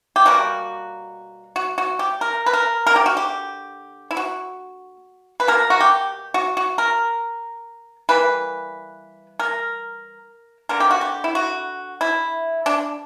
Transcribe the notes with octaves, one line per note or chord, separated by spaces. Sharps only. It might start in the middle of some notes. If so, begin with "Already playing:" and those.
G4
B2 G3 A#3 F#4
F#4
F#4
G4
A#4
B4
A#4
D3 A#3 A#4
G4
F#4
G4
E4
F#4
B4
B2 A#3 A#4
F#4
G4
F#4
F#4
A#4
E3 G3 A#3 B4
A#4
D3 A#3 A#4
G4
F#4
G4
E4
F#4
E4
D4